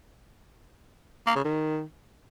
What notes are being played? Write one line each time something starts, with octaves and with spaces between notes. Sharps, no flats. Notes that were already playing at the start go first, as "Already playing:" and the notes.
A#3
C#3
D#3